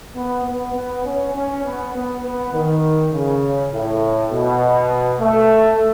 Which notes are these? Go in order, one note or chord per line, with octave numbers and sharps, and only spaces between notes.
B3
B3
B3
C#4
C#4
B3
B3
B3
D#3
C#3
A2
B2
A3